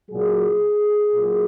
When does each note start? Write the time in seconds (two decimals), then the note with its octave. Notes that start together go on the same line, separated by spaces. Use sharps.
0.11 A#2 F#3 G#4
1.13 A#2 F#3